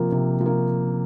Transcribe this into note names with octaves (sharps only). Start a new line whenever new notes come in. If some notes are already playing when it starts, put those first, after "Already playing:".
Already playing: C3 F3 A#3
C3
F3
A#3